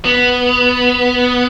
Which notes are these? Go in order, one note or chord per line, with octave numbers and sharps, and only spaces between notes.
B3